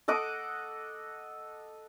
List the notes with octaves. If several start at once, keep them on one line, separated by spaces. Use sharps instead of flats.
A4 D#5 F#5 D6